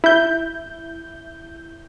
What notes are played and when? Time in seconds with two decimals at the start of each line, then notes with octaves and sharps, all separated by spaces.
0.04 E4 G6